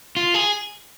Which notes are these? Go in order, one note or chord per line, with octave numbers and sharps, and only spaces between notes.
F4
G#4